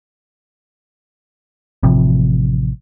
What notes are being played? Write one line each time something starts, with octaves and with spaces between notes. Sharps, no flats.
A1 C3 F3